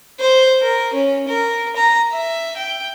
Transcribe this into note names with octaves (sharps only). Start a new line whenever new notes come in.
C5
A#4
C#4
A#4
A#5
E5
G5